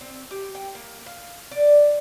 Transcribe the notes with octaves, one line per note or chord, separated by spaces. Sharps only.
C4
G4
G5
A#3
F5
D5